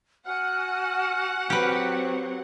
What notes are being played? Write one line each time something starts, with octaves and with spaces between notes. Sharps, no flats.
F#4 F#5 G#5 F6
F#3 C4 G4 B4